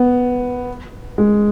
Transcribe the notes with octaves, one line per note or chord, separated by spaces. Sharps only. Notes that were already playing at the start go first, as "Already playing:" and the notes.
Already playing: B3
G#3